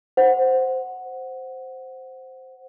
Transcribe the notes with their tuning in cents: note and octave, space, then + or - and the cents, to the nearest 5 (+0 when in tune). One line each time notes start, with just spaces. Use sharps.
C5 +0 F#5 +0